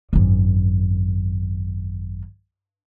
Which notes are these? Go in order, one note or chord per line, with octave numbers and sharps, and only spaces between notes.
G#1 F#2